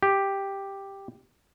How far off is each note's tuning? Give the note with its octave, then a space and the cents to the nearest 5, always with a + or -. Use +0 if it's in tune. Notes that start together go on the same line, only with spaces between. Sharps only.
G4 +5